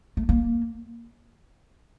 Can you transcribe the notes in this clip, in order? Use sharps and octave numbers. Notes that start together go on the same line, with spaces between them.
A3
A#3